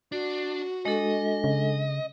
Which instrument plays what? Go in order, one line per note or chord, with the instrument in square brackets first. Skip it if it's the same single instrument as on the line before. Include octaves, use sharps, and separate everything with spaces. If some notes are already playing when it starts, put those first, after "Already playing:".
[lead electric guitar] D4 [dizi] F#4
[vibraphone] G#3 D4 A4 [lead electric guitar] D#5
[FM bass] C#3